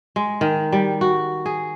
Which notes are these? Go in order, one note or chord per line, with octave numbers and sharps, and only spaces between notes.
G#3
D#3
G3
F#4
G#4